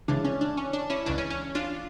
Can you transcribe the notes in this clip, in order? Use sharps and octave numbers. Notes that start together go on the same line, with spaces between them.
C#2 C#3 E3 D4
C#4
D4
C#4
D4
C#4 E4
C#2 C#3 E3 D4
C#4
C#4
D4 F4